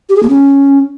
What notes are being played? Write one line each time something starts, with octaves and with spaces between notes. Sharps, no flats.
G4
G#4
A#3
C#4